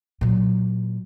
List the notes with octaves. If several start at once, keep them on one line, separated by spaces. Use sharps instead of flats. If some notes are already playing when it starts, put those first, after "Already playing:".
A#2 F#3